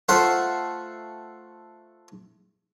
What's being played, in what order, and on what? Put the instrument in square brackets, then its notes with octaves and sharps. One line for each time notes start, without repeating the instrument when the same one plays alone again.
[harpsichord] A3 F4 C5 F#5